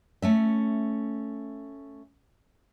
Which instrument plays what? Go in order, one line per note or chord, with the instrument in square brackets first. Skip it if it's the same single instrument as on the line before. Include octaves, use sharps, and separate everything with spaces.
[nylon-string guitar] A3 C#4 E5